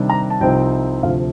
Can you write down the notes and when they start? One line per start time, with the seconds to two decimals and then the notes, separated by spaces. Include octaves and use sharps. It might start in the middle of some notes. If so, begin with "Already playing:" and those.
Already playing: C3 D#3 G3 D4
0.10 A#5
0.30 A5
0.41 C2 C3 F3 C4 D#4 G5
1.03 D2 C3 F3 A3 F5